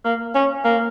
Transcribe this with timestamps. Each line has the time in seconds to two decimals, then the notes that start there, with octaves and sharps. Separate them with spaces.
0.05 A#3
0.35 C#4
0.65 A#3